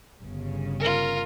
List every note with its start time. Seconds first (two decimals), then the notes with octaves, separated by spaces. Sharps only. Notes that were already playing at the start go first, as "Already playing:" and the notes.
0.21 G1 C#3
0.80 F4 A#4